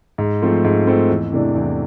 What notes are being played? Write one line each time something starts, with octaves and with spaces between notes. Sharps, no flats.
G#2
F3 A3 C4
G#2
F3 A3 C4
E2
C3 E3 A3 D4
E2